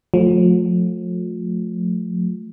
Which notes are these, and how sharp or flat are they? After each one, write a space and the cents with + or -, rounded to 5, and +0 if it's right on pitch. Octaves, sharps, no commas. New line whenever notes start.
F3 +40 A3 +0